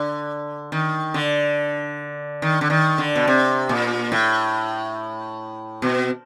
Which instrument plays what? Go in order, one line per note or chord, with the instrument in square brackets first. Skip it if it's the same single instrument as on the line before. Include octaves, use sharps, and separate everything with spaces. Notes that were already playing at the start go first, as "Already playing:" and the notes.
Already playing: [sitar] D3
D#3
D3
D#3
D3
D#3
D3
B2
C3
A#2
A2
B2